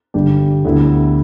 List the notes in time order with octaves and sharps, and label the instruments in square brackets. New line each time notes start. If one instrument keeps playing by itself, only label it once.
[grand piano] G1 G2 G3 D4 G4
D2 D3 B3 E4